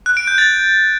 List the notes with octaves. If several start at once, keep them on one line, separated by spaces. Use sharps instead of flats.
F#6
D7
G6
A6